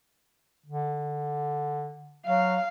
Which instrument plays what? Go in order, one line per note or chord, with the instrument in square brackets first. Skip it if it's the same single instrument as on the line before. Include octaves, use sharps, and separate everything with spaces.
[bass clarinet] D3
[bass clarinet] F#3 [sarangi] F5